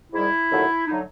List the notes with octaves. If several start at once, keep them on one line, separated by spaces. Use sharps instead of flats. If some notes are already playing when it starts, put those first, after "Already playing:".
G#2 D#3 G3 E4
D#2 D3 F#3 A3
D3 F#3 A3 D#4